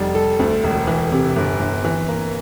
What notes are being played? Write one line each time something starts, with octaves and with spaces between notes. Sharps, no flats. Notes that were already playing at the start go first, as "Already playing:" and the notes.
Already playing: F1 G3
A4
D2
E1
E3
C3
G1
G1
E3
A#3